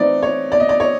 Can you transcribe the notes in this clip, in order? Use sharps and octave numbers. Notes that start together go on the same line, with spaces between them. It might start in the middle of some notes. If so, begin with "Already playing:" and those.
Already playing: E3 A3 C4 D#4 D5
C#5
D5
D#5
D5
C#5